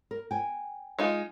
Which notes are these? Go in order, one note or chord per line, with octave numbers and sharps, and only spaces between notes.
A#4
G5 G#5
G#3 D#4 F4